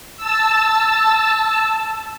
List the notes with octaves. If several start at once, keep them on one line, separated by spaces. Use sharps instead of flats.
A5 E6